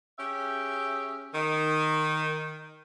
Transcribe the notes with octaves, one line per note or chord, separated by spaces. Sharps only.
C#4 G4 G#4 E5
D#3